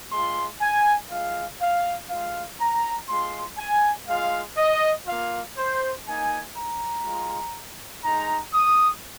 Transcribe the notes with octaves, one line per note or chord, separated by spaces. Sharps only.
G#3 F4 C6
G#5
G#3 F4 F5
F5
G#3 F4 F5
A#5
G#3 F4 C6
G#5
G#3 F4 F5
D#5
A#3 F4 F5
C5
A#3 D#4 G#5
A#5
G#3 F4
G#3 D#4 A#5
D#6